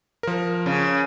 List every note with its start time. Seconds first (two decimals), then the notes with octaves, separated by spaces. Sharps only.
0.23 F3 A#4
0.66 C#3